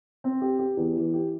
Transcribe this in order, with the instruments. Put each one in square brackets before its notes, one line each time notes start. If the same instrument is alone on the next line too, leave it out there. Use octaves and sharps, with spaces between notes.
[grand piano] C4
G4
G4
E2
E3
G4